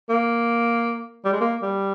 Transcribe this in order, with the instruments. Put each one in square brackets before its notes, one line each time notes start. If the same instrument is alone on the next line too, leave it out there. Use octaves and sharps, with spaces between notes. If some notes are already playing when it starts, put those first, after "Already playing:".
[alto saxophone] A#3
G3
G#3
A#3
G3